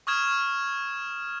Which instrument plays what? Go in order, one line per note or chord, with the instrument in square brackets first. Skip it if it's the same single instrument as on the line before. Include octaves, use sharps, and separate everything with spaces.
[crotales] C#6 D#6 F6 G#6 E7